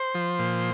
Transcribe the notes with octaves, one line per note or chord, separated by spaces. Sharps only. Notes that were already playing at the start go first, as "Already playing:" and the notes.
Already playing: C5
F3
A#2